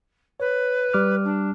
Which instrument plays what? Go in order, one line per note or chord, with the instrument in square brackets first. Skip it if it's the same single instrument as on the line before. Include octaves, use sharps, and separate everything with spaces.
[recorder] B4 [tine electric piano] C#5
[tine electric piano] G3 D6 F6
[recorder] D4